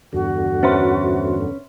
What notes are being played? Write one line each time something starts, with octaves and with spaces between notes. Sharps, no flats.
E2 G2 D3 F#4
C#4 B4 C5 E5 C6